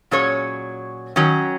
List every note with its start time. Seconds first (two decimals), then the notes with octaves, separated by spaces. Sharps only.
0.11 A#2 F#3 C#4 G#4 C#5
1.16 D#3 F#3 C#4